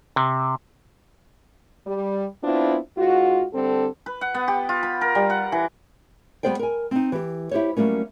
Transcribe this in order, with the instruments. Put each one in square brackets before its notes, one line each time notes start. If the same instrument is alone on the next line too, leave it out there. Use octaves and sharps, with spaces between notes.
[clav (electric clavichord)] C3
[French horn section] G3
B3 C4 D4 E4 F4
G#2 F4 F#4
D3 G3 C4 A4
[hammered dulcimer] B4
F#5
B3
G4
F4
B5
A#4
G3
F#5
E3
[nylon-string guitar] G3 B3 B4 C5 D5 G5
A#4 G#5
C4 D#4
E3 G4
E4 G4 C5 C#5
F#3 G3 A3 A#3 C#4